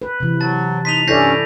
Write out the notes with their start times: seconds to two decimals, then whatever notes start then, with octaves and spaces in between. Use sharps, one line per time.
0.02 B4
0.20 C3 E3
0.41 F#3 A5 A6
0.85 D#4 C6 B6 D#7 F7
1.07 G2 C#4 E4 A4 D5 G6 A#6 C7